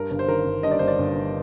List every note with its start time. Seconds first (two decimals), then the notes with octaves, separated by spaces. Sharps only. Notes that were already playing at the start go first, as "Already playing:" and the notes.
Already playing: G2 A#4
0.11 G1
0.19 C5
0.28 D#3 A#4
0.46 G1
0.63 G2 D#5
0.71 D5
0.79 G1 C5
0.88 D5
0.98 G1
1.16 G2